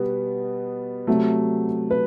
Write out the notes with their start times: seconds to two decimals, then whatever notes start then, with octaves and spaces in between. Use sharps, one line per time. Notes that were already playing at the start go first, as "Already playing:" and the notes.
Already playing: B2 G3 B3
1.07 C3 F#3 A3
1.91 B4